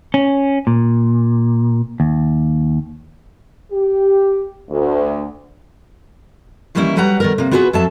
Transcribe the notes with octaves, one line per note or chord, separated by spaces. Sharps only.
C#4
A#2
D#2
G4
D2
D#3 E3 G3 A#3 C#4 E4
F#3 G3 B4 F#5 A#5
D#3 B3 A#4
C3 A#3
B3 F4 F#4 G#4 A#4 B4
F2 F#3 A4 E5 A5